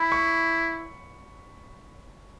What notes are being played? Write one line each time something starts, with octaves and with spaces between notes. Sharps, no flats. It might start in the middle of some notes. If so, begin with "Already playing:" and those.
Already playing: E4 B5
C#6